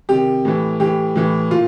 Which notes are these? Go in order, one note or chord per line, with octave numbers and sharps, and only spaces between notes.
C3 D#3 G4
A2 E3
A2 E3 G4
A2 E3
A#2 F4